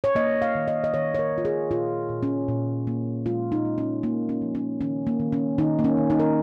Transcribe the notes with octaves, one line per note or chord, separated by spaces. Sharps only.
C#5
A#3 D#5
F5
D#3
D#5
D#5
D#3 C#5
C#5
A#4
D#3
F4
G#4
A#2 F4
A#2
C#4
A#2
A#3
G#3 F4
D#4
G#3
C#4
A#2 A#3
C#4
F3
C#4
D#3 C#4
A#3
D#3
C#4
D#3 D#4
A#3
C#4
D#3
D#4
A#4